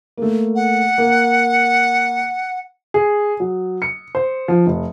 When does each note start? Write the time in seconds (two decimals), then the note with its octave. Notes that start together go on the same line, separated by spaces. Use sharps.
0.17 A3 A#3
0.56 F#5
0.98 A#3
2.94 G#4
3.40 F#3
3.82 C#7
4.15 C5
4.48 F3
4.66 F1